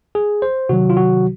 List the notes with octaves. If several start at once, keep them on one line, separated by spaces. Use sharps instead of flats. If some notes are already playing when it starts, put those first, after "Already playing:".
G#4
C5
C3 D#3 F#3 F#4
F4
F#4